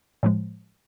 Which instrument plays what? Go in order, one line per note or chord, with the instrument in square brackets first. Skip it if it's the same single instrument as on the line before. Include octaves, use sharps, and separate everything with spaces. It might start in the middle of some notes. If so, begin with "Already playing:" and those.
[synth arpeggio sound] A2 F3 G#3